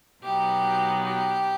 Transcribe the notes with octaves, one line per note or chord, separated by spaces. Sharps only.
B2 F#3 B3 D#4 G4
G4